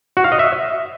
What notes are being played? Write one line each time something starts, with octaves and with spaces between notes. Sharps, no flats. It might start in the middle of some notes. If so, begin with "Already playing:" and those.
F#4
F5
D#5
E5